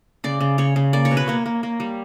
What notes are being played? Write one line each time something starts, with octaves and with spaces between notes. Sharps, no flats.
C#3 D5
C#3
C#3 C#5
C#3
A#3 D5
C#5
B2
B4
A#3 C#5
A#3
A#3
G3